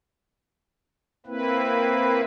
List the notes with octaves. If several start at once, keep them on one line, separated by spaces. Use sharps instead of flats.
A#3 C4 E4 B4